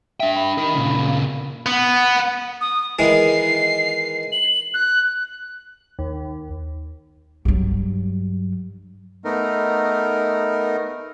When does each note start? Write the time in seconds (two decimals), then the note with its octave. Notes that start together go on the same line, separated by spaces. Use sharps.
0.20 D4 E5 G5
0.36 B5
0.58 D#4 A#4
0.74 A#2 C#3
1.07 A#3
1.66 B3
2.61 D#6
2.99 D#3 E3 G#3 C7
4.32 F#7
4.74 F#6
5.99 D#2
7.45 G2 F#3
9.25 A3 B3 D#4 A#4